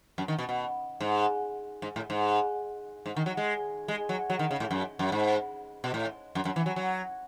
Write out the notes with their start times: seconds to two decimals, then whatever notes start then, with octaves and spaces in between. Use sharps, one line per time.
0.18 F#2
0.28 D#3
0.39 B2
0.49 B2
1.00 G#2
1.82 G#2
1.96 A2
2.10 G#2
3.06 G#2
3.16 D#3
3.26 F#3
3.37 G#3
3.88 G#3
4.09 F#3
4.30 F#3
4.39 D#3
4.51 C#3
4.60 A2
4.71 F#2
4.99 F#2
5.12 G#2
5.84 B2
5.94 A2
6.35 F#2
6.45 F#2
6.56 E3
6.66 F#3
6.76 F#3